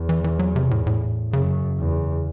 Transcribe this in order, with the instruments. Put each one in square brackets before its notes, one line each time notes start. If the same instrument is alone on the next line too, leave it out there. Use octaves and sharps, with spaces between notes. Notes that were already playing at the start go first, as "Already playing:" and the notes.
Already playing: [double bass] E2
[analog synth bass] E3
E3
F#3
C3
A2
A2
[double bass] F#2 [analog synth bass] C#3
[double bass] E2